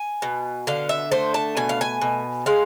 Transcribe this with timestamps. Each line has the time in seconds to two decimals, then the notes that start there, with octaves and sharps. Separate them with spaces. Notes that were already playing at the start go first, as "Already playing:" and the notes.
Already playing: G#5
0.22 B2
0.67 D3 F5
0.89 E5
1.12 A3 C5
1.34 A5
1.57 B2 G#5
1.69 F5
1.81 G#5
2.02 B2
2.46 G#3 F5